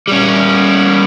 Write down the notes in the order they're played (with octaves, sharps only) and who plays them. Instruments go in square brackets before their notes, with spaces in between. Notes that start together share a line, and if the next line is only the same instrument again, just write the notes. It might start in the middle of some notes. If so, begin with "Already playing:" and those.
[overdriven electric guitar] G3 C#4